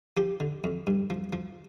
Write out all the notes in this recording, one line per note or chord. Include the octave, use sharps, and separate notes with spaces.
F3 G4
D3
F2
G2
F3
F3